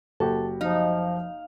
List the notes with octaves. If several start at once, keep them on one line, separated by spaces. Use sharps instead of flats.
F#1 F#4 G4 A4
F3 D#4 F5